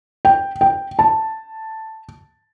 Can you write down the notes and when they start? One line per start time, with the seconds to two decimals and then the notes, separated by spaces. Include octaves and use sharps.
0.25 G5
0.61 G5
0.99 A5